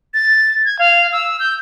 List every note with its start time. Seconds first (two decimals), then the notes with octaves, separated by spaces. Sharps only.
0.14 A6
0.65 G#6
0.79 F5
1.12 E6
1.40 G6